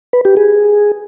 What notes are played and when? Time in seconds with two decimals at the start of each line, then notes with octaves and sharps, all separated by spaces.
0.13 B4
0.25 G4
0.37 G#4